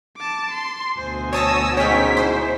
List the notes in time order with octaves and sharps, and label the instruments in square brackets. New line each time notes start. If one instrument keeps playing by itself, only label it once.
[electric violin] A5 D6
C6
[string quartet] D2 B2 G#5 [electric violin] C5
[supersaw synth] C#5 A5 A#6 [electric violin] D#6 E6
[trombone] G#2 [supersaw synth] C#4 C#5 [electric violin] G5 B6
[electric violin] E4 [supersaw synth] C5